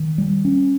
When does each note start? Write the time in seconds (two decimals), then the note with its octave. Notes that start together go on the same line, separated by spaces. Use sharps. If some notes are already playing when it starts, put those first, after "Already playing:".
Already playing: D#3
0.18 G3
0.45 C#4